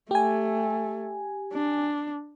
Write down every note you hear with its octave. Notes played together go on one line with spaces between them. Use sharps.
A3 G4 G#5
D4